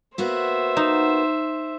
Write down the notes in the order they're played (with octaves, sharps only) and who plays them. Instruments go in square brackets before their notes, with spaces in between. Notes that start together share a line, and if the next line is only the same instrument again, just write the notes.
[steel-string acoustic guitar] A#3 B3 F#4 [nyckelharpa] C5 E5
[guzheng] D#4